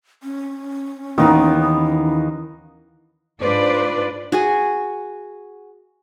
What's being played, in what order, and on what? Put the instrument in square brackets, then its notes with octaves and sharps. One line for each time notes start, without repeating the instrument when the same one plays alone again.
[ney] C#4
[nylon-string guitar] D#2 E3 [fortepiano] D#3 [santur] B3 D#4 A#4
[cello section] G#2 D4 F4 B4 C5 D5
[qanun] F#4 G#4 G#5